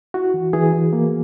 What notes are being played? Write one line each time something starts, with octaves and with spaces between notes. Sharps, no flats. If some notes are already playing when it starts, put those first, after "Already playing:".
E4 F#4
E3
E3 G#4
E3
A#3